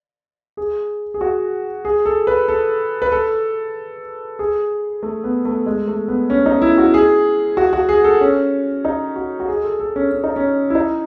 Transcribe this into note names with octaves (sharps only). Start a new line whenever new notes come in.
G#4
G#4
F#4
G#4
A4
B4
A4
B4
A4
G#4
A3
B3
A3
G#3
A3
B3
C#4
D#4
E4
F#4
G#4
F#4
F#4
G#4
A4
C#4
D#4
F#4
F#4
G#4
A4
A4
C#4
C#4
D#4
C#4
E4
D#4